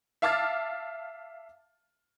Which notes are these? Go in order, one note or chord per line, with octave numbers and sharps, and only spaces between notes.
E5 F5 A5 D6 F6 A6